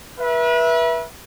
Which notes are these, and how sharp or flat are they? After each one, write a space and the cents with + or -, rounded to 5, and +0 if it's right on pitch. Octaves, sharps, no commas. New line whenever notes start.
B4 -35 E5 +0